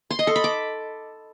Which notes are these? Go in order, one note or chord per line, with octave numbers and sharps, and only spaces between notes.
C6
D#5
A4
B5
D6